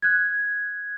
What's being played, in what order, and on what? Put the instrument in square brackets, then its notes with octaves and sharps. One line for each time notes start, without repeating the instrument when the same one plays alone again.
[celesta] F#6 G#6